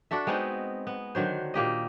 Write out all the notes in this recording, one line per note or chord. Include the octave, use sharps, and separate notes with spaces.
D4 F#4 A4 E5
G#3 B3 C4 D#4
B3
D3 D#3 F#3 C5
A#2 A#3 G4 D#5